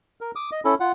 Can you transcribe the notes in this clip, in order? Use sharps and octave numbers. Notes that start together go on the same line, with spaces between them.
A#4
D6 D#6
D#5
C#4 E4 A4
F4 F#5